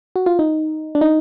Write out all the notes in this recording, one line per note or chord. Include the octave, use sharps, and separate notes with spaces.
F#4
F4
D#4
D4
D#4